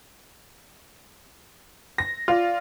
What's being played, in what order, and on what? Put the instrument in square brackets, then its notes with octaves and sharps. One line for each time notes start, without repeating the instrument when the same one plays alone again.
[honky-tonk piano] A#6
[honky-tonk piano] F4 [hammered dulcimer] D5 F5